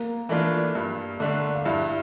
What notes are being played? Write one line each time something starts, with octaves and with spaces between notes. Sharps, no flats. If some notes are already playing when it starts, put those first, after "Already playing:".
Already playing: A#3 A#4
E3 A3 D4 F4
G2
D3 A3 D4
F5
G2 E4 E5